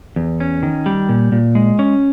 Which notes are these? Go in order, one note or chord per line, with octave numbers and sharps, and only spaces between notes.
E2
C#4
D#3
G3
A#2
A#2
G#3
C#4